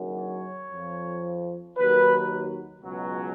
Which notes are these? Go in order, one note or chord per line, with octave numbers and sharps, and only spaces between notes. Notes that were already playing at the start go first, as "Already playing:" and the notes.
Already playing: F#1 F#2 D#3 F#3
C#5
F2 F3
D#2 D#3 F#3 B4
C#2 B2 F#3